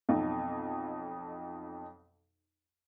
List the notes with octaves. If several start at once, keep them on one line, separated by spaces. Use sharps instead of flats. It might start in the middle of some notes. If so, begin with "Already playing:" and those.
B1 F2 D#4